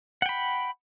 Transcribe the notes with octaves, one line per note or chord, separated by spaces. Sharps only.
F#5 G5 B5